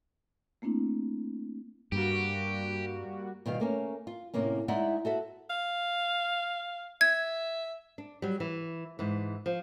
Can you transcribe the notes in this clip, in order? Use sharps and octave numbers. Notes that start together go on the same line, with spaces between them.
A3 A#3 C4 D4 E4
G2 G3 A#3 F#4 G4
B2 D#3 G3 F5
A3 A#3 C#4
F4
A2 C3 A#3 C#4
G#3 D#4 E4 D5 E5 F#5
F#4 A4 E5
F5
E5 G#6
D4
F#3 G3
E3
G#2 E3
F3